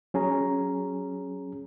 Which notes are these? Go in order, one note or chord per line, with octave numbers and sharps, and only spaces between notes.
F#3 C#4 G#4 A#5